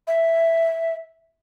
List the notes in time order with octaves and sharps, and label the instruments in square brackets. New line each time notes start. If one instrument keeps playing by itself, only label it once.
[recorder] E5